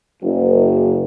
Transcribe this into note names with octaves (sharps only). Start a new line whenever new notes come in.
F#1